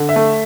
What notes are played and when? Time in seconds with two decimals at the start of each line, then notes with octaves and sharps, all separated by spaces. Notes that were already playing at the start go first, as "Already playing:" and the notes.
Already playing: D3
0.09 E5
0.16 A3